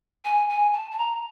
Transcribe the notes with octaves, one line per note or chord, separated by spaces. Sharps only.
G#5
G#5
A5
A5
A#5